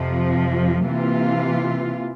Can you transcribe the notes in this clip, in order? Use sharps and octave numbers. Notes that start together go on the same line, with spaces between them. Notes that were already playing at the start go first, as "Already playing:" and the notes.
Already playing: F2 C3 F3
C3 E3 A#3 F4